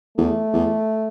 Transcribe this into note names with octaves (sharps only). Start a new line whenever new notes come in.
E2 A3
E2